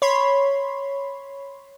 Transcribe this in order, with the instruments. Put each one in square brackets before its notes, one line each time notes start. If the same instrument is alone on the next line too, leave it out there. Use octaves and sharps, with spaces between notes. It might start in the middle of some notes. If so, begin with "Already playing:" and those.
[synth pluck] C#5 B5 C6